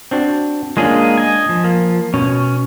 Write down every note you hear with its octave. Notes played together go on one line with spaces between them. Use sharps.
C4 D4 F#4
G#3 A#3 C#4 D4 F4 G#4
D#5 G#5
F3
A#3
B2 C#4